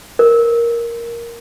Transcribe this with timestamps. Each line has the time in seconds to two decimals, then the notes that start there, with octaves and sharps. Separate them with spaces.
0.19 A#4